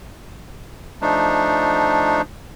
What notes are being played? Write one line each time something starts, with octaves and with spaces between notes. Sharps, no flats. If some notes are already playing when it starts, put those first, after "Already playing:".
F3 A3 D4 D#4